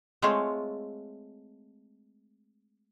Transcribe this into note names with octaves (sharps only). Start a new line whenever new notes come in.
G#3 A3 C4 F4 C#5